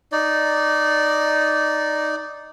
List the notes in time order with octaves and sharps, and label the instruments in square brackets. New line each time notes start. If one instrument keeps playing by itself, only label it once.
[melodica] D#4 D5